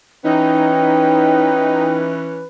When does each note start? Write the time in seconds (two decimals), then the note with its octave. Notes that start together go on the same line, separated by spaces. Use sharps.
0.25 E3 C#4 D#4 B4 G5